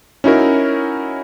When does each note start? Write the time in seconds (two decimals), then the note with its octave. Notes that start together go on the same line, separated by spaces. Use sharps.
0.24 C#4 D#4 E4 F#4 A#4